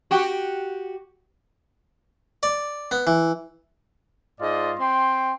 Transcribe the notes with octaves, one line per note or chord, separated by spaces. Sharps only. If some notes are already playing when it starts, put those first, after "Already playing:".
F#4 G4
D5
B3
E3
G#2 F4 D5 D#5
C4 G5 C6